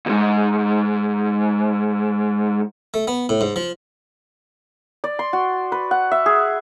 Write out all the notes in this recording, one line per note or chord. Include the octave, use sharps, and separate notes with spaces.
D2 G#2
A3
B3
A2
G#2
F3
D5
C6
F#4
B4
F#5
E5
G#4